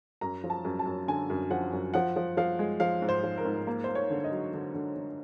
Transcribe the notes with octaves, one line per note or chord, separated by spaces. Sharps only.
F#2 A#5
F3
A5
F#2
A5
F#2
D3 G#5
F#2
F3 F#5
F#2
F3 F#5
F3
F3 F5
G#3
F3 F5
G#2
C5
F3
A#4
G#2
A#3
A#3 C5
C#5
D3
D#5
F#3
D3
D3
D3